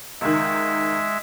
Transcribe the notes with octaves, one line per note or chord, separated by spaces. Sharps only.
C#2 D#3 G#3 E5